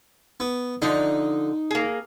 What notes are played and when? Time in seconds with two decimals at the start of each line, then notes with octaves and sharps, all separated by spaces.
0.40 B3
0.82 D3 F3 D#4
1.71 A#3 G#4